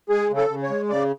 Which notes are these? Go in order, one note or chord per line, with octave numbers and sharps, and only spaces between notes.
G#3 G#4
C#3
A4
C#3
C#5
G#3
C#3 D5